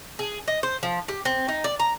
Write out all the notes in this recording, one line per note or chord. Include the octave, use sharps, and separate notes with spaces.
G#4
D#5
C5
F3
G4
C4
D#4
D5
A#5